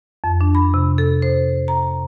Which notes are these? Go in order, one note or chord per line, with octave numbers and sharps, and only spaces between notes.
F2
D4
B5
C3
A4
C5
A#5